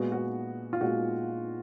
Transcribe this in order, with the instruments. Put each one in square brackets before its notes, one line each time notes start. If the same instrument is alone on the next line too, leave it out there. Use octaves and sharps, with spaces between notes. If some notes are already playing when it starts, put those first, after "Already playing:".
Already playing: [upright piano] A#2 G#3 B3 F#4
F#4
F4
A#2 G#3 B3 F#4